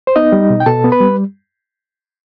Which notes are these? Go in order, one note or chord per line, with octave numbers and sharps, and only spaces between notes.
C5
B3 D#4 D#5
G3
B2
G5
B2 A4 A5
B3
B4 B5
G3